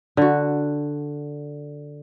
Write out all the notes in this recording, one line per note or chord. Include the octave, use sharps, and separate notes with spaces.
D3 F#4